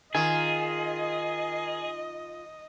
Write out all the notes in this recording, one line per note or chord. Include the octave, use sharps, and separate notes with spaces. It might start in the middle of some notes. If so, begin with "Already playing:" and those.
D#3 F4 G#4 D#5 G#5